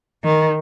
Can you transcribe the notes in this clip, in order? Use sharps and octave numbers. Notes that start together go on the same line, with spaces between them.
D#3